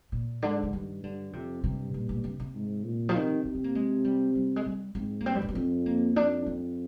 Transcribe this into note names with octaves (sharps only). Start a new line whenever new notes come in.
A#2
G#2 D3
D3
G2 D#3
G2 D3
F2 C3
G2 C3
A#2
A#2
C3
C3
G#2
A#2
F3
C3 D#3
C3 A#3
C4
A#3
G#3
G3
G3
G#3
G3
G#2 C4
A#3
G2 C4
G3
G#3
A#3
F2 C4
A#3
F2 D4
C4